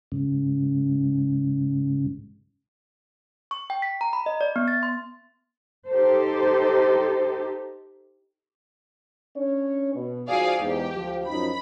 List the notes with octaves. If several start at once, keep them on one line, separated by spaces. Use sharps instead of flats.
G#2 C#3
C#6
G5
B6
A#5
B5
D#5
D5
B3
A6
C6
D#4 G4 A4 C5
C#4 D4 C#5
B2
G#2 F3 F#4 G#4 D5 F5
E2 G#2 G4
D2 F3
F#2 F3 D#4 B5